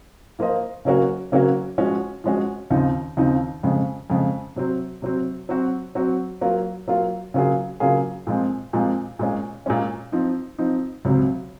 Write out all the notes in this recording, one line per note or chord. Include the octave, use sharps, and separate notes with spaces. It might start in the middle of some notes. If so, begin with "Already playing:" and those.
F3 A#3 F4 C5 D#5
C#3 F#3 A#3 C#4 F#4
C#3 F#3 A#3 C#4 F#4
F3 G#3 C#4 F#4
F3 G#3 C#4 F#4
D#2 C#3 F3 C4 D#4
D#2 C#3 F3 C4 D#4
F2 C#3 G#3
F2 C#3 G#3
C3 F#3 C4
C3 F#3 C4
F#3 C4 F#4
F#3 C4 F#4
F#3 A#3 F4
F#3 A#3 F4
C#3 F#3 A#3 F4 G#4
C#3 F#3 A#3 F4 G#4
A#2 F3 G#3 C4
A#2 F3 G#3 C4
A#2 G#3 C#4
A#2 G#3 C#4
F3 C4 D#4
F3 C4 D#4
C#2 C3 F#3 C4